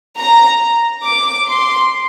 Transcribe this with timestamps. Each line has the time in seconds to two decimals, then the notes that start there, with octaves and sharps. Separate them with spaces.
0.18 A#5
1.05 D6
1.48 C6